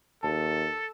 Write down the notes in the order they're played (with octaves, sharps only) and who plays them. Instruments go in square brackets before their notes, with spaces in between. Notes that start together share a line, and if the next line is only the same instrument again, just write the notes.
[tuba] D#2 [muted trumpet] A4 [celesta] A5